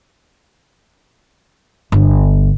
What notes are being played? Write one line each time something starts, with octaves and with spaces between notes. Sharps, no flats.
G1